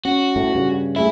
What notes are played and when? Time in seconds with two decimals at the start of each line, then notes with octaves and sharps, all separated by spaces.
0.05 C#4 F#4
0.36 A2
0.55 G2 C#3
0.96 A3 E4 G#4 E5